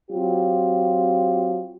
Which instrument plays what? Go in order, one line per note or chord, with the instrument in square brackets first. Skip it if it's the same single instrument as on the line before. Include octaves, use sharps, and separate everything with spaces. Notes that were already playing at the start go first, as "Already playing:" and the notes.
[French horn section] F#3 C4 F4 G4